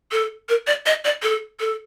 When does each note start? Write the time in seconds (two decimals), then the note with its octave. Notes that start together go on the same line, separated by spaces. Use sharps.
0.12 A4
0.49 A#4
0.67 D5
0.86 D#5
1.05 D5
1.23 A4
1.60 A4